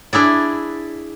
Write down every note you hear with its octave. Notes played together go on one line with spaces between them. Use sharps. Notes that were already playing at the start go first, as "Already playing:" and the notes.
D4 E4 G#4 D5